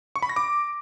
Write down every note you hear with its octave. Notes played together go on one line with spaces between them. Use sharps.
C#6
B5
A#6
D6